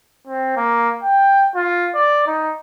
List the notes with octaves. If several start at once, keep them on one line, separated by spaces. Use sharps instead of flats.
C4
A#3
G5
F4
D5
D#4